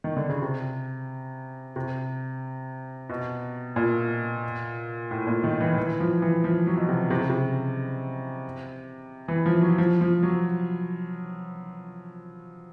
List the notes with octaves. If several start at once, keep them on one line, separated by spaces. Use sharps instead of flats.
D#3
D3
C#3
C3
C3
B2
A#2
A2
A#2
D#3
E3
E3
F3
E3
F3
F#3
B2
C3
C3
C#3
C3
E3
F3
F#3
F3
F3
F#3